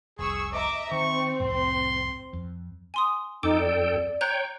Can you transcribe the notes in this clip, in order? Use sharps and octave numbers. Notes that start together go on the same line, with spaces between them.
F1 C2 G#4 C#6 E6
D#5 E5 A#5 D6
D#3 C4 C#6
C2 F2 A2 C6
F2
G#5 C6 D#6
F2 D#4 A4 G5 D6
D5
C#5 G5 A#5 F#6 G6